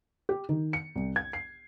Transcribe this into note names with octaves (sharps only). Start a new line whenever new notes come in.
G4
D#3
C#7
C2
G#6
C7